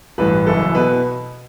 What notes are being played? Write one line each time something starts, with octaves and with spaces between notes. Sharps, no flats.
A1 G2 E3 B4
F#1 F#2 E3 A4
B2 B4